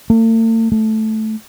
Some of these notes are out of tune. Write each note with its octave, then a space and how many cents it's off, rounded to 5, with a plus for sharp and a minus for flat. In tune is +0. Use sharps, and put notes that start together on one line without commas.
A3 +45
A3 -10